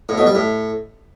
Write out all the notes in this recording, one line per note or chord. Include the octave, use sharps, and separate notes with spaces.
A2
B2
G3
A2